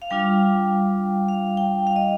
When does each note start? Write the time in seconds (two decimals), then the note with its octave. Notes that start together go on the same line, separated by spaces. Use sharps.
0.02 F5
0.10 G3 D4 F4 G5
1.29 F5
1.57 G5
1.87 F5
1.96 D#5